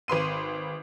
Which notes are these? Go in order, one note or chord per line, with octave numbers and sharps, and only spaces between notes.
G#1 B4 C6 D#7